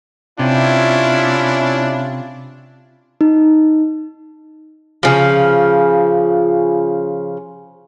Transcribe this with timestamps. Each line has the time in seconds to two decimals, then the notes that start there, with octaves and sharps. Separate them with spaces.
0.39 C3 C#4 D4 E4 F4
3.21 D#4
5.03 C#3 F3